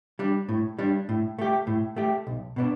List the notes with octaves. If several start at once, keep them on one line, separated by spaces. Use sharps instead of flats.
G3 D4
A2
G3 D4
A2
A3 G4
A2
A3 G4
B1
B2 B3 D4